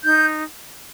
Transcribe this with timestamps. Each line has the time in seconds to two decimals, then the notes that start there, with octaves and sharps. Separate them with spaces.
0.03 D#4 G6